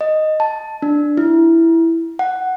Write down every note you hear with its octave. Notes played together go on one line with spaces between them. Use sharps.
D#5
A5
D4
E4
F#5